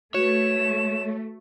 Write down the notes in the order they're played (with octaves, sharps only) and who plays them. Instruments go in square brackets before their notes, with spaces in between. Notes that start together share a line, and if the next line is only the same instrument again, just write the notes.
[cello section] A3 [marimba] F#4 B4 [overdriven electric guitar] C#5 [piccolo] E7